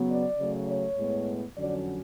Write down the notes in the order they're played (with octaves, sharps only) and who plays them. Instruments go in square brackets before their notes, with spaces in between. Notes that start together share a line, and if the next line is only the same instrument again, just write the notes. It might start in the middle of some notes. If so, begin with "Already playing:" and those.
Already playing: [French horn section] C#3 F#3 B3
D5
C#3 F#3 A3
C#5
A2 G#3 B3
F2 D3 F#3 C#4 D5